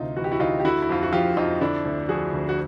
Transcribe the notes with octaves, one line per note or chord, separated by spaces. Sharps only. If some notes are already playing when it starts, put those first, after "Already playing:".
Already playing: D2 C3 D#4 F4
E3 F#4
G4
E4 F#4
D2 D#4 F4
G4
D3 E4 F#4
E4
F2 F4
F#4
F3 F4 G4
F2 D#4 F4
D3 D4 E4
D2
F3 F#4 G#4
D2
F#4